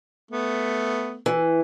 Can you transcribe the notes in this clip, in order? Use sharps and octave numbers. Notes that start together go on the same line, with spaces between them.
A3 B3
E3